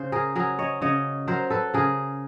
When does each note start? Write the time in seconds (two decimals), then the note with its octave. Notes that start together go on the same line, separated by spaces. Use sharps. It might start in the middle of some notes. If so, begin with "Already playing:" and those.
Already playing: C#3 C5
0.12 G#4 A#4
0.36 F#3 G#4 A#4
0.59 C#5 D#5
0.81 C#3 C#5 D#5
1.27 F#3 A#4 C5
1.50 A4 B4
1.74 C#3 G#4 A#4